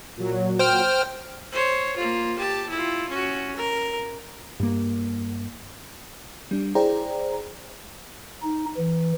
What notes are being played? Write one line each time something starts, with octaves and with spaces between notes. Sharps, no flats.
A#2 F#3
C5 G5 F6
C5 C#5
A#3 F4
G4 A5
E4 F4
C#4 F#4
A#4
G2 A#3
G3 D4
E4 G#4 C5 D5 G5 A#5
D#4
E3